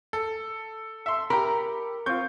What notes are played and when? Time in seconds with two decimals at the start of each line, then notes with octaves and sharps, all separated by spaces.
0.13 A4
1.06 E5 C6
1.30 G4 A#4 B5
2.06 C4 F4 C#6 G6